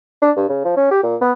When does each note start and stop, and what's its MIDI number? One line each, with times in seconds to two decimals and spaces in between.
0.22 0.31 62
0.36 0.48 43
0.49 0.63 49
0.65 0.74 53
0.77 0.90 61
0.91 0.99 67
1.03 1.16 46
1.21 1.32 59